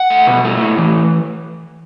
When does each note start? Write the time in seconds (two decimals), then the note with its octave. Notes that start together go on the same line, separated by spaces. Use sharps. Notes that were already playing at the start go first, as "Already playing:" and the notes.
Already playing: F#5
0.10 A3
0.27 B2
0.45 A3
0.61 A2
0.78 E3